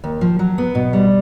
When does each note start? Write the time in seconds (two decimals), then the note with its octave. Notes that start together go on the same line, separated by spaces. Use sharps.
0.04 D#2
0.21 F3
0.39 F#3
0.58 B3
0.75 B2
0.93 G3